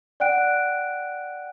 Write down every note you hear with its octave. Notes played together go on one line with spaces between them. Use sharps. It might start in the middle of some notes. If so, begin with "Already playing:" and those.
D5 F#5 G5 F#6 D7